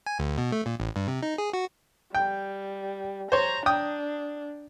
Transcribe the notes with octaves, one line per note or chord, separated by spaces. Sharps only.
G#5
D2
B2
A3
A#2
A1
G2
C3
D#4
G#4
F#4
G3 G5
C5 C#5 A#5
D4 G5 D#6